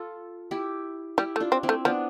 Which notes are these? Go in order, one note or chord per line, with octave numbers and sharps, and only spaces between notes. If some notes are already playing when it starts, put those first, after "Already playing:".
Already playing: F4 A4
E4 G4
G3 E4 G4
A3
D4 F4
C4
C4 E4
A3
F3 B3 D4